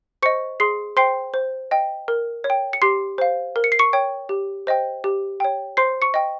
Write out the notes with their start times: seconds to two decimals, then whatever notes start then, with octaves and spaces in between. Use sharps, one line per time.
0.23 C5 D#5 C#6 C#7
0.60 G#4 C6 C7
0.97 C5 G5 C6 C7
1.34 C5
1.71 D#5 G5
2.08 A#4
2.44 C#5
2.50 G5
2.73 C#7
2.82 G4 C6 C7
3.18 C5 F5
3.56 A#4
3.64 C#7
3.72 C7
3.79 C#6 C#7
3.93 C#5 G5
4.29 G4
4.67 C5 D#5 G5
5.04 G4
5.40 C#5 G5
5.77 C5 C6 C7
6.02 C#6 C#7
6.14 D#5 G5